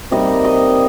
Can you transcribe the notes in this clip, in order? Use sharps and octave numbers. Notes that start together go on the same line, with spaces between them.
C3 G3 A#3 D#4 D#5
D#5